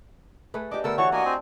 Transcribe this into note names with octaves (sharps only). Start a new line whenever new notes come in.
A3 G#4 B4
D4 G4 D#5 D6
D3 A3 B3 A4 A#4 A5 E6
E3 F#4 C#5 F#5 A5 C#6
A#3 D4 F#4 D#5 G#5
C4